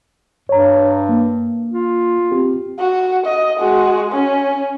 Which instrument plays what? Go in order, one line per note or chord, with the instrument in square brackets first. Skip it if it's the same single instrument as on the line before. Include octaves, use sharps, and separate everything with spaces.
[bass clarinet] G2 [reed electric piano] C#5 A#5
[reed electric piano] A#3
[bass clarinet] F4
[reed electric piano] C4 G4
[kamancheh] F#4
D#5
G#3 F#4
C#4